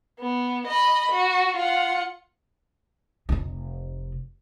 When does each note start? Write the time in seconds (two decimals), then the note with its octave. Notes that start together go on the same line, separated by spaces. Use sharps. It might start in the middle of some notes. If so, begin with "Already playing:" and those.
0.20 B3
0.67 D#5 B5
1.12 F#4
1.57 F4 F#5
3.29 F1 D#4